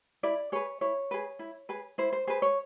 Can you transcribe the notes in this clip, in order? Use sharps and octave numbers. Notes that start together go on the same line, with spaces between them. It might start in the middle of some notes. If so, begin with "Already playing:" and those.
E4 D5
G#4 B4 C#5
E4 C#5
G#4 B4
E4
G#4 B4
E4 C5
C5
G#4 B4 C5
C#5